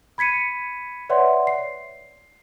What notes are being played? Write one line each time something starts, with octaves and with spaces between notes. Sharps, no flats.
B5 G#6 B6 C#7 D#7
B4 C#5 D5 E5 F#5 C6
C7